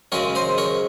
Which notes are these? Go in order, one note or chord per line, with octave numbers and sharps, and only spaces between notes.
F#2 C#3 G#3 A#4 C#5
C5 D#5
A#4 C#5